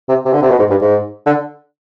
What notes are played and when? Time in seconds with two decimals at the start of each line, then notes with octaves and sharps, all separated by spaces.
0.09 C3
0.25 C3
0.33 D3
0.42 C3
0.51 B2
0.59 G#2
0.70 G2
0.82 G#2
1.26 D3